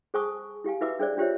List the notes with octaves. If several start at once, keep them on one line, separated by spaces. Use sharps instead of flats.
G#4 C5 G#5 A5 C#6 D#6
E4 G4 F5 G#5
E4 F#4 B4 E5 D6 E6
D4 G#4 C5 D5
D4 F4 G4 C5 C#5 E5